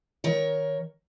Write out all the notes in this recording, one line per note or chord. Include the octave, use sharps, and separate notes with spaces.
D#3 A#4 C#5